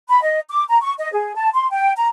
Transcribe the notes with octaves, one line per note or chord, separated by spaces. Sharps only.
B5
D#5
D6
A#5
C#6
D#5
G#4
A5
C6
G5
A#5